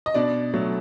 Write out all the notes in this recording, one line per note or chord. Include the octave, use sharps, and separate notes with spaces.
D#5
B2 D4 D5
F#3 A3